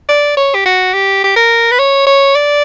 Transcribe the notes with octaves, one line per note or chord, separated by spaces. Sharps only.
D5
C#5
G4
F#4
G4
G4
A#4
B4
C#5
C#5
D5